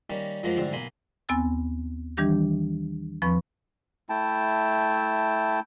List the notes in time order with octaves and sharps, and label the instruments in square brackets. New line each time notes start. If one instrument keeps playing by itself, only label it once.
[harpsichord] D#3 G3 A#3 C#4
F#2 F3 F#3 G#3 A#3 C5
A1 G#2 D3 C4
B1 A#3 G#5 B5 C6
[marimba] D#2 B3 C4 G#5 E6 A6
D#3 E3 G3 D4 G4 A#6
E2 F3 C4 B4 B5 C#6
[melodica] A3 E4 G5 A5